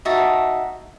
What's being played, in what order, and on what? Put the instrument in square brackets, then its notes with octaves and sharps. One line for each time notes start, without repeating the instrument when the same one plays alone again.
[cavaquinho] D#4 F#4 E5 A5